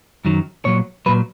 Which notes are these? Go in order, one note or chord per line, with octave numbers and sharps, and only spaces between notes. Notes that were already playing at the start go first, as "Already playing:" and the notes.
F#2 D#3 F#3
A#2 F#3 C#5
A#2 F#3 B4